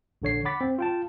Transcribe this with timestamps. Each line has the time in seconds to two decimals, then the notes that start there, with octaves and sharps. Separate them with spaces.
0.22 A#1 D3 C#5 C7
0.45 F#5 B5 D6 A6 B6
0.61 C4
0.78 F4 G5 A5